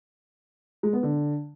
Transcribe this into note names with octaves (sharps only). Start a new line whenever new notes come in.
G#3
B3
D3